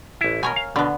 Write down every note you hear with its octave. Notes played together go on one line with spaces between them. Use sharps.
A1 E4
B2 A#4 C#5 G#5
F5
B2 D3 B3